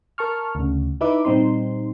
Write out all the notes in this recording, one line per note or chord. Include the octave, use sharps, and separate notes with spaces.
A#4 A5 C#6 F6
D2 C#3
D#4 E4 B4 E5 D6
A#2 G3 C4 D#4 C6